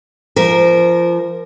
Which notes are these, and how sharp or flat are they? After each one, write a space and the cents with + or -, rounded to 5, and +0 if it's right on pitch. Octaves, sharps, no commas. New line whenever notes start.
F3 -25 A#4 +0